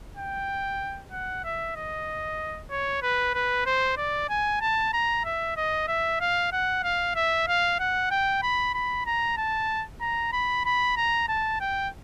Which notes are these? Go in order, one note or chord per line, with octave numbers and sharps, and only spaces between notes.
G5
F#5
E5
D#5
C#5
B4
B4
C5
D5
G#5
A5
A#5
E5
D#5
E5
F5
F#5
F5
E5
F5
F#5
G5
B5
B5
A#5
A5
A#5
B5
B5
A#5
A5
G5